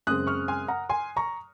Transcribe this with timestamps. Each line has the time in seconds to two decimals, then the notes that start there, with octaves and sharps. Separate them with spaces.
0.07 F#2 C#3 G#3 C4 D#6 F#6
0.27 C#6 F6
0.48 G#5 C6
0.68 F#5 A#5
0.89 G#5 C6
1.17 A#5 C#6